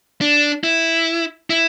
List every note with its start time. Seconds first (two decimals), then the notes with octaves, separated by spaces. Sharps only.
0.21 D4
0.64 E4
1.50 E4